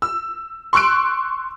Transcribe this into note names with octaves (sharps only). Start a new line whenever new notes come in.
E6
C6 C#6 E6 F#6 D7